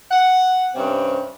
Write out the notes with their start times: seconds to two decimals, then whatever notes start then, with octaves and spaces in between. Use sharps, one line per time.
0.11 F#5
0.75 G2 C3 C4 C#4